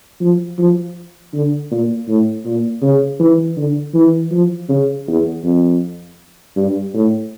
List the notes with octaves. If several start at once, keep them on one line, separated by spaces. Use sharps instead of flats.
F3
F3
D3
A#2
A2
A#2
C#3
E3
D3
E3
F3
C#3
E2
F2
G2
A2